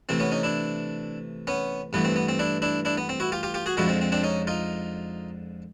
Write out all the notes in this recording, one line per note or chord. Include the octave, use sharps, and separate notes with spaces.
C3 E3 A3 C4
B3 C#4
C#4 D#4
D4 E4
B3 C#4
G2 E3 A3 B3
C4
B3
C4
D4 E4
D4 E4
D4 E4
B3
C4
E4 F#4
F4 G4
F4 G4
F4 G4
F#4 G#4
F2 D3 F3 G#3 E4 F#4
C4
C4
C4 D4
C#4 D#4
D#4 F4